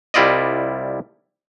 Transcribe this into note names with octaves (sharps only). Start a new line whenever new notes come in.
C2 G3 E4 F4 D5 D#5